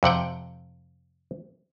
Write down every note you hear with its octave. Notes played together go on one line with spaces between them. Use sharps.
F2 C3 F#5 G5